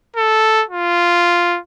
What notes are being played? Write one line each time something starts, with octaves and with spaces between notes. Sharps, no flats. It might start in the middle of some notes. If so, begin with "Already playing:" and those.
A4
F4